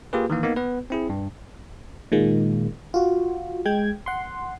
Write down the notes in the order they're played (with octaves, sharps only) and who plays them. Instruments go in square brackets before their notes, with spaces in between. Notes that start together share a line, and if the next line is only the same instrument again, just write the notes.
[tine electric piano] A#3 F4 G4 G#4 B4
D#3 E3 A#3
A#3 B3 D#4
B3 B4
C4 E4 G#4
G2
[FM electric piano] A#2 D#3 G#3 A#3
F4 F#4
G#3 G5 G#6
F#5 C6